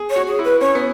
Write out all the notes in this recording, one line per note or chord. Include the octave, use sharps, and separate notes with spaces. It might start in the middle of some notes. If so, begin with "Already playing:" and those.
Already playing: G#4
C#5
F#4
G#4
E4
B4
C#4 C#5
B3